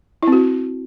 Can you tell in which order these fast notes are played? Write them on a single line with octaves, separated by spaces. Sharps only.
E4 C4 F#4